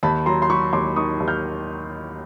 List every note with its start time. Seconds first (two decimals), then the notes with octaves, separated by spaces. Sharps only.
0.03 D#2 A5 B5
0.26 F#3 A#5 C6
0.42 C6
0.50 F#3 B5 C#6
0.73 D#2 C6 D6
0.96 D#3 C#6 D#6
1.20 D#2
1.28 F6 G6